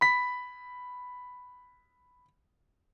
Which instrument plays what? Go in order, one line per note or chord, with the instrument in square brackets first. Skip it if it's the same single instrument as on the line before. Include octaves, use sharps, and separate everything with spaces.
[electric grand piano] B5 B6